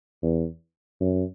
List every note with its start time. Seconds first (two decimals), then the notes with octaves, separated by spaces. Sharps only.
0.23 E2
1.01 F#2